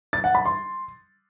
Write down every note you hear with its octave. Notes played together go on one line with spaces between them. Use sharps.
A6
F#5
B5
C6